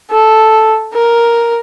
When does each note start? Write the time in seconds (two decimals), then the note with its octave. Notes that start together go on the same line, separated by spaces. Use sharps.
0.11 A4
0.94 A#4